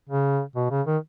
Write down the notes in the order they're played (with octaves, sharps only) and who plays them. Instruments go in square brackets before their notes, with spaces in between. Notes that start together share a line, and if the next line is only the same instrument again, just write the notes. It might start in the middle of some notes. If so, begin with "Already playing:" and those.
[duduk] C#3
B2
C#3
D#3